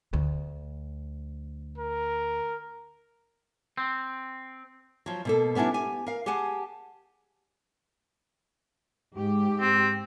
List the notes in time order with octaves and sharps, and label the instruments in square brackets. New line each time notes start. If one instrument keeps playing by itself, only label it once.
[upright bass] D2
[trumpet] A#4
[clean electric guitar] C4
[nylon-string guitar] F3 F#3
B2 A#3 A4
G3 B3 C#4 D4 E4
G4 G#5
A#4 F5
G4 G#4 F#5 G#5 A5
[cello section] G#2 G4
[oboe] C4